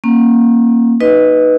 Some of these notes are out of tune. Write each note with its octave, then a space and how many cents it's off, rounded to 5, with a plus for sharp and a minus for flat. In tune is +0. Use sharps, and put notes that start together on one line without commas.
A#3 +0 C#4 -30
D#4 +0 B4 +0 D#5 -5